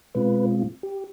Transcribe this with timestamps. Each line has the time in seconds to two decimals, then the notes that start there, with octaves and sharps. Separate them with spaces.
0.15 B2 G#3 C4 F4 B4
0.83 G4